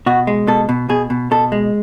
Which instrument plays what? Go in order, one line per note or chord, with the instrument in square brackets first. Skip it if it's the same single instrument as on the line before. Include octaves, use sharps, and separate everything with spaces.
[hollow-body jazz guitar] B2 F#4
G#3
B2 A4
B2
B2 G#4
B2
B2 A4
G#3